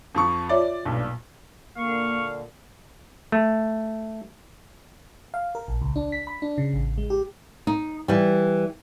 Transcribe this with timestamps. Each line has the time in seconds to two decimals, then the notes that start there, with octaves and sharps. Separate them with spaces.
0.14 F2 F3 C#6
0.49 F4 C#5 D5 E5
0.86 B1 G2 A#2
1.77 A#2 D3 A#3 F5 C#6
3.32 A3
5.34 F5
5.55 A#4
5.68 A#1
5.82 C#2
5.96 D4
6.12 B6
6.27 B5
6.42 D4
6.58 C#3
6.73 A1
6.98 G#3
7.10 G4
7.67 D#4
8.08 E3 G3